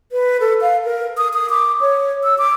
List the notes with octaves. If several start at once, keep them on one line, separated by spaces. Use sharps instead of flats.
B4
A4
F5
A#4
D#6
D#6
D6
C#5
E6
D6